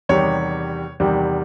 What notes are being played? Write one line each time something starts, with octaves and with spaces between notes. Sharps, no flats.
E2 C3 D#3 G3 C#5
E2 C3 D#3 G3